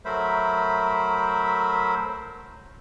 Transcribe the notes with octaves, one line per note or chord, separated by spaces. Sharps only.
F#3 A3 A#4 C5 E5 B5